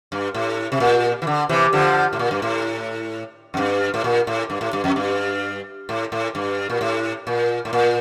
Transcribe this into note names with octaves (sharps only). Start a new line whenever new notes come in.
G2
A2
C3
A#2
E3
D3
C3 E3
D3 F3
A2
A#2
G2
A2
F2
G2
A2
A#2
A2
G2
A2
G2
F2
G2
A2
A2
G2
A#2
A2
A#2
A2
A#2